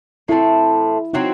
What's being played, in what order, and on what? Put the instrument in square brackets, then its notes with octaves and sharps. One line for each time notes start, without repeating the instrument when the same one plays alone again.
[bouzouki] A2 F#3 A3 C4 [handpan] E4
[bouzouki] F#3 C4 F#4 [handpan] D#4